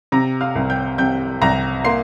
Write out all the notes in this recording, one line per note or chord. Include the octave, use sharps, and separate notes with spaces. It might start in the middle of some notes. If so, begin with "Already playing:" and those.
C3 A#5 A#6
F5 F6
C2
G5 G6
C3 G5 G6
C2 A#5 A#6
A#3 C6 C7